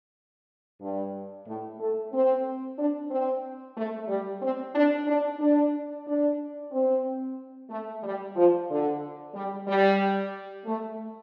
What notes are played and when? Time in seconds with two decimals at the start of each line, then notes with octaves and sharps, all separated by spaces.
0.81 G2
1.46 A2
1.79 A3
2.12 C4
2.78 D4
3.10 C4
3.76 A3
4.08 G3
4.41 C4
4.75 D4
5.07 D4
5.39 D4
6.06 D4
6.71 C4
7.69 A3
8.03 G3
8.35 F3
8.69 D3
9.34 G3
9.67 G3
10.65 A3